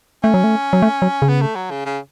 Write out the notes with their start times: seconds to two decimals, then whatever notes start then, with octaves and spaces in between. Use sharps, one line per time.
0.23 A3 C#4
0.34 F#3
0.44 A3
0.73 F#3
0.82 A3
1.02 F#3
1.22 C#3
1.29 B3
1.42 A3
1.56 F#3
1.71 C#3
1.85 C#3